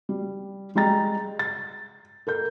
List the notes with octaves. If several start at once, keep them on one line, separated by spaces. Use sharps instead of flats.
G3
G3 G#3 G5 A#5 A6
A6
A4 A#4 G6